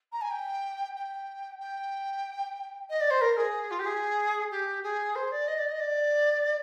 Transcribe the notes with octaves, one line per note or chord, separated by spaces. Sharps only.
A#5
G#5
G5
G5
G5
D#5
D5
C5
A#4
G#4
F4
G4
G#4
G4
G#4
C5
D5
D#5
D5
D#5
D5